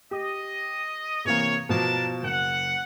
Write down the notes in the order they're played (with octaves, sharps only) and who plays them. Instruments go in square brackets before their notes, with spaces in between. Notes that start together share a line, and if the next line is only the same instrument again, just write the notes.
[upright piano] G4 [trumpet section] D#5
[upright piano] C3 E3 A#3 [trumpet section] C#5
[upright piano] B2 F3 [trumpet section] D4 A#4 A5
[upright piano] F#1 [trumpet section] F#5